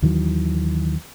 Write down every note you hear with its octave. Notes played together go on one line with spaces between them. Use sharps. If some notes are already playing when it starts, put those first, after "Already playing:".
D#2 D#3 E3 F#3